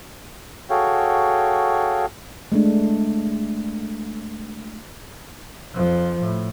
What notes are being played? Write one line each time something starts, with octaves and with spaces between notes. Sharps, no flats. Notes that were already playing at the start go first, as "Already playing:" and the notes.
F#4 G#4 A4 C#5 F5 G5
G#3 A3 D4
F2 F3
A2